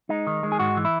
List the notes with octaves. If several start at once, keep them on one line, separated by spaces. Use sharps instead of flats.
G#3 D#4
D#3
G#3
G#4
G#2 F#4
E3
E4